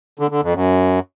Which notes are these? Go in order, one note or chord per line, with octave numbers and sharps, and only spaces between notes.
D3
D3
F2
F#2